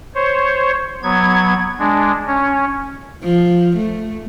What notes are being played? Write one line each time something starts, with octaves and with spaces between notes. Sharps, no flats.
C5 C#5
F#3 B3 G#6
G#3 D4
C#4
F3
A3